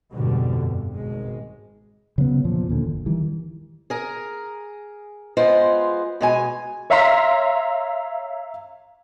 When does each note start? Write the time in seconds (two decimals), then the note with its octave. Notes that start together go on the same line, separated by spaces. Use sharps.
0.12 F2 G#2 B2 D3 G3
0.63 G2
0.94 G#1 B2 G#3
2.18 C#3 F#3 B3
2.44 E2 A#2 F3
2.69 D#2 A#2 D3
2.84 F#1
3.06 D#3 E3 G3
3.90 G#4 A#4
5.37 G#3 B3 F4 C5
6.21 B2 G#3 G#5
6.90 C#5 E5 F5 A#5 C6 B6